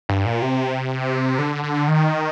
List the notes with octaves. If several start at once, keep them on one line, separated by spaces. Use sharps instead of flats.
G2
A#2
C3
D3
D3
D#3